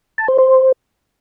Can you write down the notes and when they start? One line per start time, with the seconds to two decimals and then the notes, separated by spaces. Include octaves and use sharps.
0.18 A5
0.28 C5
0.38 C5